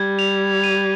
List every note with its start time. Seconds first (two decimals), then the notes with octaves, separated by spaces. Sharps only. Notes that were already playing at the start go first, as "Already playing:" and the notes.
Already playing: G3 G#6
0.19 F7
0.64 D#7